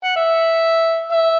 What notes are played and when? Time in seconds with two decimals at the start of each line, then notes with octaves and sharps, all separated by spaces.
0.04 F#5
0.16 E5
1.12 E5